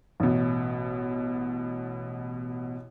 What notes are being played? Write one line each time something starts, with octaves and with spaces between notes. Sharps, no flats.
A1 B2